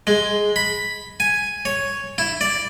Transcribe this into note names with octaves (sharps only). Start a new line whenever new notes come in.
G#3
B5
G#5
C#5
E4
D5